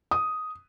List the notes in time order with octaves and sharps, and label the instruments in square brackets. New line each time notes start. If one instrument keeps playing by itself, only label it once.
[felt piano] D#6